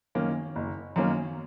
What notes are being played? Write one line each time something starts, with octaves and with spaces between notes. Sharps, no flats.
F#2 D#3 A#3 C#4
F#1
F#2 D#3 A#3 C#4